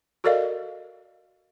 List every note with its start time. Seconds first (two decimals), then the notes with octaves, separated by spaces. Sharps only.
0.24 F#4 A4 A#4 D5 D#5 F5